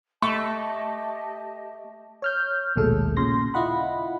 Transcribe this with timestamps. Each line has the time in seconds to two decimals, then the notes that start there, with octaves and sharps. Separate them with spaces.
0.22 A3 G4 D#5 A5 C#6
2.22 C#5 F6 G6
2.76 A#1 D#2 B2 G#3 A3 A4
3.17 A#2 C#3 C6 A#6
3.54 E4 F4 D#5 F#5 B5